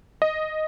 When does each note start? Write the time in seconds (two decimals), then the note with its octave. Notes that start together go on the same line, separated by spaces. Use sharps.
0.22 D#5